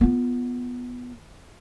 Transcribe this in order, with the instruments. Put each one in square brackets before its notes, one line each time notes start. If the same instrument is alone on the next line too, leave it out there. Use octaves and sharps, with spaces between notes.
[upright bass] B3 F4